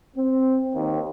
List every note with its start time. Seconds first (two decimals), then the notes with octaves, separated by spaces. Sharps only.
0.16 C4
0.73 D#2